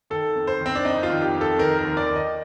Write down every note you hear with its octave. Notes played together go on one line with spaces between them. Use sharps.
D#3 A4
F2
C5
D#3 C4
D4
F2 D#4
F4
D#3
G4
F2
A4
D#3 A#4
A#4
D#2
D5
D#3
D#5